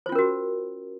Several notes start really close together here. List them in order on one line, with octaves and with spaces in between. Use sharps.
C5 F4 C#4 A#4 F#4